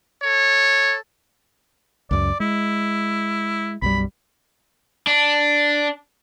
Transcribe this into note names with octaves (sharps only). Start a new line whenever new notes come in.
A4 C#5
C#2 F#2 D5
G#3 E4
B1 F#2 G3 B5
D4